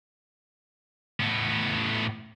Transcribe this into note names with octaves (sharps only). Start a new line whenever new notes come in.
A2 B3